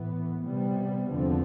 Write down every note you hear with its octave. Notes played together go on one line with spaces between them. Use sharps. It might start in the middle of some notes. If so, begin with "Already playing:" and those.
Already playing: A2 E3 B3
C3 G3 B3
E2 D3 F3 C4